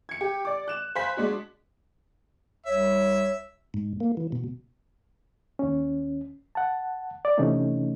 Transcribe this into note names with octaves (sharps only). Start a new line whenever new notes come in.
G#6 C#7
G4
D5 D6
F#6 E7
C5 F5 G#5 B5 F#6 B6
G#3 D4 F#4
C2 C#5 E5
G#2
A#3
E3
B2
D#2 C#4
F#5 A5
D5
C3 E3 A3 C#4 D#4